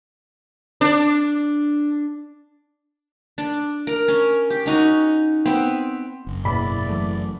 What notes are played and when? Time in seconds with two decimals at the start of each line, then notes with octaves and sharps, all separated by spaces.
0.81 D4
3.38 D4
3.87 A#4
4.08 C#4
4.50 G4
4.66 C#4 D#4 F#4
5.46 B3 C4
6.27 F#1
6.45 G#2 B2 A#3 E4 G4 D5 B5
6.89 E3 F#3 A3